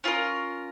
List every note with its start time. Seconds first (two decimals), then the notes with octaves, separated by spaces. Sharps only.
0.04 C#4 F4 A#4